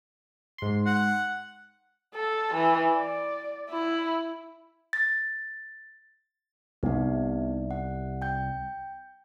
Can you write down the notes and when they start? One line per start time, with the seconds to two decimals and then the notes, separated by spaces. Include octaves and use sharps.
0.58 G#2 C6
0.86 F#5
2.15 A4
2.54 E3
2.93 D5
3.69 E4
4.93 A6
6.83 C2 C3 B3 D#4
7.71 F#5
8.22 G5 G6